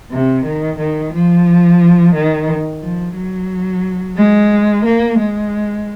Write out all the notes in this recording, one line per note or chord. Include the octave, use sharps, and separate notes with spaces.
C3
D#3
D#3
F3
D#3
F3
F#3
G#3
A#3
G#3